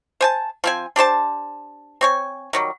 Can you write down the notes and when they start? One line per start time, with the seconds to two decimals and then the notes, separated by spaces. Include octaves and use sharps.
0.21 C5 G#5 A5
0.64 F3 C4 G#5
0.96 D4 G4 C5 A5
2.01 C4 C#5 G#5
2.53 D#3 F#3 G3